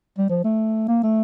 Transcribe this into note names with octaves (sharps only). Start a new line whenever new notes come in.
G3
F3
A3
A#3
A3